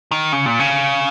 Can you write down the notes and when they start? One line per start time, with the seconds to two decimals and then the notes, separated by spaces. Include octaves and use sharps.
0.11 D#3
0.32 C#3
0.46 A#2
0.59 C#3